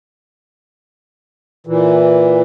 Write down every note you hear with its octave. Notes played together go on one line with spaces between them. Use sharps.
A#2 E3